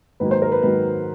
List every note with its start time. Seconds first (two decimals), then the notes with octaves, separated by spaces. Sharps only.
0.20 G#2 D#3 F#3 A#3 B4
0.31 C5
0.42 A#4
0.52 B4
0.62 G#2 D#3 F#3 A#3 B4